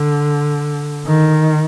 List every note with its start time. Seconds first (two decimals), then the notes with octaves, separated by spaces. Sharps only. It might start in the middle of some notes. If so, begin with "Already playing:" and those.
Already playing: D3
1.06 D#3